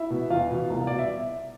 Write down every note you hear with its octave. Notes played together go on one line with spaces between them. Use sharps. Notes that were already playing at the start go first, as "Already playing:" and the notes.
Already playing: E4 E5
B2
E2 F4 F5
B2
C2
B2 D5
E5